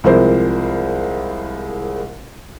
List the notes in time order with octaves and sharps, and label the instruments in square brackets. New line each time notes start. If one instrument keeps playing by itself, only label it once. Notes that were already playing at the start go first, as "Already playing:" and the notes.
[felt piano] C2 F3 G#3 E4 A#4 C5